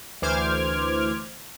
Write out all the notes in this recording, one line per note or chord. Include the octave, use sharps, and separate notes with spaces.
D2 E3 C5 D6 F6 G#6